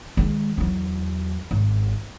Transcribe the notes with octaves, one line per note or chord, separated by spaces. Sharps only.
D#3 G#3
E2 F#3
G#1